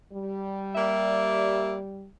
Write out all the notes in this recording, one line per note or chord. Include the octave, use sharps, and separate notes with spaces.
G3
A#3 D5 E5